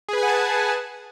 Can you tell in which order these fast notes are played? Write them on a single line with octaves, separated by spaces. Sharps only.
G#4 B4 G#5 F#5 A5